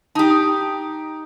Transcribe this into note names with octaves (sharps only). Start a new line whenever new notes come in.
D#4 G4 A5 D#6
D#6